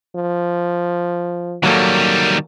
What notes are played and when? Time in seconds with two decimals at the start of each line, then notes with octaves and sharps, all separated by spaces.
0.16 F3
1.63 D#3 F#3 G3 A#3 A4